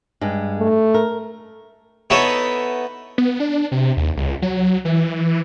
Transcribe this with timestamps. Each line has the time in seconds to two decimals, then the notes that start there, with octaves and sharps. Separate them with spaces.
0.21 G2 G#3
0.59 A3
0.94 A#4
2.10 B3 D#4 E4 A4 B4 C#5
3.18 B3
3.40 D4
3.72 C3
3.97 D#2
4.17 C#2
4.42 F#3
4.85 E3